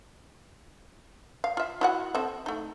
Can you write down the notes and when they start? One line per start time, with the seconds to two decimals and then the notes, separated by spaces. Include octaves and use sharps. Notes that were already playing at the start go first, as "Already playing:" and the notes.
1.44 F5
1.57 F4 E5
1.81 E4 F#4 F#5
2.15 C4 A4 E5
2.46 A3 D#4